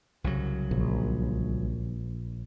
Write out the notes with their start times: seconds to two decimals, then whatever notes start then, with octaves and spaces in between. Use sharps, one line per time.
0.24 C2 C#3 F#3
0.71 A#1